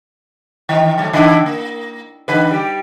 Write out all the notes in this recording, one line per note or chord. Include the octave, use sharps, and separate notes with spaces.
D#3 E3
D#3 F#3 A3
D3 D4 E4
A#3
D3 B4
G3 G4